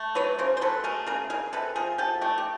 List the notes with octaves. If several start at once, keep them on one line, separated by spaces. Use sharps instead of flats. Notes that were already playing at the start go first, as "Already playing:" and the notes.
Already playing: A3
F#3 B4 C#5
C#3 A#4 C5
C5
F#3 A4 B4
A3 G#4 A#4
C#3 G#4 A#4
C#3 G#4 A#4
C3 A4 B4
F3 G#4 A#4
F3 G4 A4
A3 G4 A4
G4